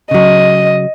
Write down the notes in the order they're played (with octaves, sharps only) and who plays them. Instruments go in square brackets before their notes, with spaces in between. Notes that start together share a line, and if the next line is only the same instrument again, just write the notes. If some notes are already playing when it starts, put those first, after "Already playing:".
[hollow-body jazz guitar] C#3 F#3 [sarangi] D#5